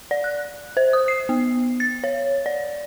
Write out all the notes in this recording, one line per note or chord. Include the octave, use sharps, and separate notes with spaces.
D5
F#6
C5
D#6
C7
B3
A6
C#5
D5